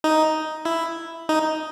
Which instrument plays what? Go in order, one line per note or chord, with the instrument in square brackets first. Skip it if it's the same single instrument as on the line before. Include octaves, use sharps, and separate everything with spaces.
[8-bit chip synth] D#4
E4
D#4